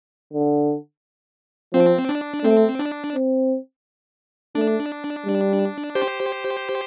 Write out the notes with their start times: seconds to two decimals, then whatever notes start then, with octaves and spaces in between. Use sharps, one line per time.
0.33 D3
1.74 F3 C4
2.09 D4
2.44 A3 C4
2.79 D4
3.15 C4
4.55 A3 D4
5.25 G3
5.95 G4 C5